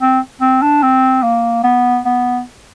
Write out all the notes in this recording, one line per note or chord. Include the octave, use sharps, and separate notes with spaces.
C4
C4
D4
C4
A#3
B3
B3